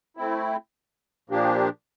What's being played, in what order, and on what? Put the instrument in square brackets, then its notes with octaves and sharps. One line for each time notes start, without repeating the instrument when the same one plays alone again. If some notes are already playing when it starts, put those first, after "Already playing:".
[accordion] A3 C4 E4
A#2 F3 A#3 D4 G4